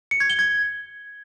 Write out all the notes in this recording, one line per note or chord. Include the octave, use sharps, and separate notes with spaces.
C#7
G#6
G7
G#6